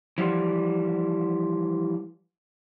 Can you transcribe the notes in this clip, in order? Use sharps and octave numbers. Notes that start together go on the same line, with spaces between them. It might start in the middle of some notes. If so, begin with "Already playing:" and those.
E3 F3 G3